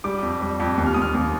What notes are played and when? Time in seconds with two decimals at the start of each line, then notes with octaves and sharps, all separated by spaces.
0.04 G3 D6
0.22 F2
0.42 G3
0.60 F2
0.78 D#2
0.86 F6
0.94 D#2 D#6
1.02 F6
1.15 D#2